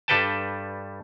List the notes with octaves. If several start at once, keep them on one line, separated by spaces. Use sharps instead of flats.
G2 G3 A4 B4 G5 A5